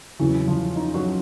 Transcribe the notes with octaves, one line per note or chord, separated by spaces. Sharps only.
E2 C#3 E3 F#3 E4
F3 F4
D#4
F#3 F#4